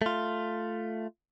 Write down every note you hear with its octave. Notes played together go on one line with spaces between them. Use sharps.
A3 F4